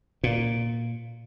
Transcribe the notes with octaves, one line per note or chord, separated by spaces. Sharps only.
A#2